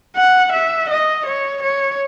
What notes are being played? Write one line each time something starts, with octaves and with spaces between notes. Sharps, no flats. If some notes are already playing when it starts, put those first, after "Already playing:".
F#5
E5
D#5
C#5
C#5